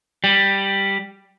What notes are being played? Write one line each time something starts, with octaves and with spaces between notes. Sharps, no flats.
G3